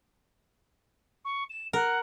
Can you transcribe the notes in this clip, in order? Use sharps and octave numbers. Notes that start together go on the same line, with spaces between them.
C#6
E7
A#4 F#5